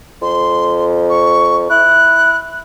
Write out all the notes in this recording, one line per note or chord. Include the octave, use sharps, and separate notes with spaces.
F2 C6
C#6
E4 F#6